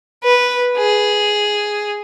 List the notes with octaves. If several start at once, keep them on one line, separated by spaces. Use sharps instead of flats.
B4
G#4